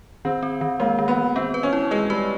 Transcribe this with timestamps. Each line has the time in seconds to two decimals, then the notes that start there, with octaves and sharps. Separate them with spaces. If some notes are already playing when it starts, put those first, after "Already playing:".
0.25 D#3 C4
0.43 C4
0.61 D#3
0.80 G#3 A#3
0.99 D#3
1.08 B3
1.18 D#3
1.36 B3 C4
1.54 B4
1.63 C#4
1.73 E4
1.91 G#3 B4
2.10 G3 B4